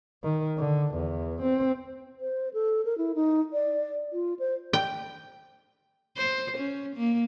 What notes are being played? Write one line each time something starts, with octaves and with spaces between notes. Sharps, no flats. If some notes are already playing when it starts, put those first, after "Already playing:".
D#3
D3
E2
C4
C5
A4
A#4
E4
D#4
D5
F4
C5
G5
C5
C#4
A#3